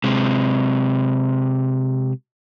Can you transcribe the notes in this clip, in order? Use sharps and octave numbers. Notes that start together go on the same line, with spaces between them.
C3 G#3